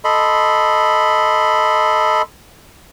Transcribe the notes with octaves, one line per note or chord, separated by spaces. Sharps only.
A4 D#5 B5 C6